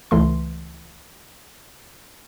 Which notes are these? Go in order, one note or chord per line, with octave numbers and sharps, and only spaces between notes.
C#2 E3 A3 C6